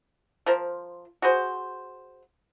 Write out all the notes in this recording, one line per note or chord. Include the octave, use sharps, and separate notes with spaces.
F3 A#4 C5
F#4 G#4 C5